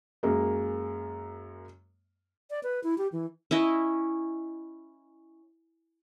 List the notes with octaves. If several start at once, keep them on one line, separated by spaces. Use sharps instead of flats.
F#2 G#3 A#3
D5
B4
E4
G4
E3
C#4 E4 D#5